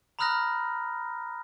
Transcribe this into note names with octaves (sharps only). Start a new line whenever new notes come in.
A#5 B5 D#6 F6 F#6 A#6